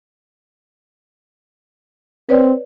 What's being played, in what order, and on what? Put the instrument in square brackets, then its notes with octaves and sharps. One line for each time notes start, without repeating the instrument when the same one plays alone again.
[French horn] C4 [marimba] B4 C#5 D5